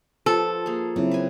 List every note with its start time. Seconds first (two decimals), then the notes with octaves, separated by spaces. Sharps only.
0.26 F3 A4 B4 F#5
0.66 A#3 G#4
0.96 C#3 F#3 C4 E4
1.11 B4 G#5